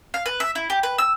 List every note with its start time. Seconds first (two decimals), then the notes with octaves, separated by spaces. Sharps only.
0.14 F5
0.26 B4
0.40 E5
0.55 E4
0.70 G4
0.83 B4
0.98 E6